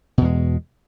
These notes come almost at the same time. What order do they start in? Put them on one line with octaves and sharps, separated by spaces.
B2 E2 G#3